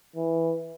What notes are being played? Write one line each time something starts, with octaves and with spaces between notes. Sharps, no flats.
E3